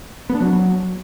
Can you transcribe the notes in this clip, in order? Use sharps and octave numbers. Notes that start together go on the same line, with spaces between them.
B3
D4
F#3